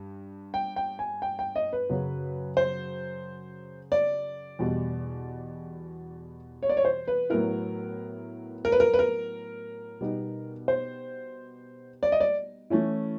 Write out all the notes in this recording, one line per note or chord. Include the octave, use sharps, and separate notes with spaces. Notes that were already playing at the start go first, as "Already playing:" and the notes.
Already playing: G2
G5
G5
G#5
G5
G5
D#5
B4
F#2 C#3 F#3
C5
D5
E2 B2 G3
C#5
D5
C#5
C5
B4
A2 F#3 B3 E4 A#4
A#4
B4
A#4
B4
A#4
B2 G3 B3 D#4
C5
D5
D#5
D5
E3 A3 C#4 E4